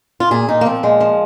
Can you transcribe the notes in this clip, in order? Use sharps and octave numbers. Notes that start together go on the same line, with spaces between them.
F4
A#2 G#4
A#2 D#4
A#3
F3 C4
A#2 G#3
F3